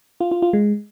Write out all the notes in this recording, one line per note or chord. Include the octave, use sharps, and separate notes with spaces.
F4
F4
F4
G#3